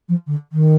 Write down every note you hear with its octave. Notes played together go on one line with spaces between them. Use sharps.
F3
D3
D#3